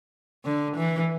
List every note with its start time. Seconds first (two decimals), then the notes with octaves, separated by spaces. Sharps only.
0.45 D3
0.76 E3